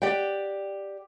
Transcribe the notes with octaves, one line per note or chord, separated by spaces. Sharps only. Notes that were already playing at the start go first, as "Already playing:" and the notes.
G4 D5 F#5 G5